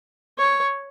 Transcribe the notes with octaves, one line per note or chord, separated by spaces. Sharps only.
C#5